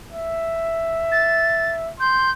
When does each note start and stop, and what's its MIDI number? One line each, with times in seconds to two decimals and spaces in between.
0.12 1.91 76
1.12 1.72 93
2.00 2.32 84
2.00 2.30 91